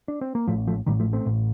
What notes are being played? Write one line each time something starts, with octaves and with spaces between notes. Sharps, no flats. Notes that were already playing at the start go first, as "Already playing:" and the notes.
D4
C4
A#3
A1 A2 F3 A3
F3 A3
A1 A2 D#3 G3
F3 A3
A3 C4
A1 A2